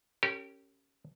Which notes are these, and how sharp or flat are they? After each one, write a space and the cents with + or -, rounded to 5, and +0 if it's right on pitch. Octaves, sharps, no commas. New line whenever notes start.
C#4 +0 G4 -15 A#4 -40